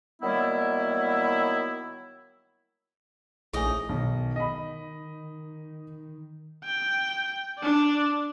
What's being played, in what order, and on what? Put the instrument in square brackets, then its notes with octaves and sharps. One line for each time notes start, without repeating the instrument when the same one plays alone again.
[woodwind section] D#3 F#3 G3 A#3 B3 E4
[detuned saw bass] A#1 [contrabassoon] A2 [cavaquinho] D#4 D#5 [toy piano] G#4 G#5
[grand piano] B1 [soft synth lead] D#3
[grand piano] D#5 B5
[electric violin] G5
D4 D5